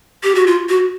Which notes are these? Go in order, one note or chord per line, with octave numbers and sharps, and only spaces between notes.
G4
F#4
F4
F#4